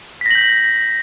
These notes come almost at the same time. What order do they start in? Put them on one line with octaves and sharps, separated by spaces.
B6 A#6 F#7 G6